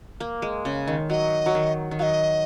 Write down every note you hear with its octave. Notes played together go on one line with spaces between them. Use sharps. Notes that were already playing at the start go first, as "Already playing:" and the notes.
A#3
G#3
C#3
D#3
F#3 D#5
F#3
D#3
D#3
F#3 D#5 F5